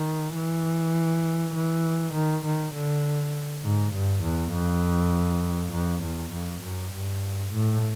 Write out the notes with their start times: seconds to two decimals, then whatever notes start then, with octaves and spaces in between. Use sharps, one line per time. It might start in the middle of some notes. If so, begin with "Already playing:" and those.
Already playing: D#3
0.35 E3
1.55 E3
2.14 D#3
2.45 D#3
2.74 D3
3.64 G#2
3.94 G2
4.23 E2
4.53 F2
5.73 F2
6.03 E2
6.32 F2
6.62 F#2
6.93 G2
7.53 A2